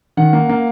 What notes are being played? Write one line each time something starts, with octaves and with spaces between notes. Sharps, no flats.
D#3 F#5
A#3
A#3